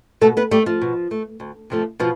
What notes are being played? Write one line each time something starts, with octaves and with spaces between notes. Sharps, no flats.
B2 A3 A4
B3 B4
G3 A3 G4
F3 F4
B2
A3
D2
C3 F3 A3
B2 F3 F4